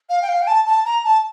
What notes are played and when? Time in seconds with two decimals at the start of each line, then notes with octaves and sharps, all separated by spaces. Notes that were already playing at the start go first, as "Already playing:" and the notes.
0.09 F5
0.22 G5
0.28 F5
0.42 G5
0.47 A5
0.66 A5
0.85 A#5
1.04 A5